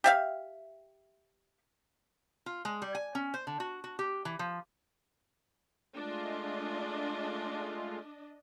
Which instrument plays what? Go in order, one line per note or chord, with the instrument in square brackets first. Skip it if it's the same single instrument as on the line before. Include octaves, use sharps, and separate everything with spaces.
[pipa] G4 E5 F5
[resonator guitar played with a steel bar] F4
G#3
G3
G#5
C#4
C5
D3
F#4
F#4
G4
E3
F3
[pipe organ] G#3 A3 F4 [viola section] D4 D#5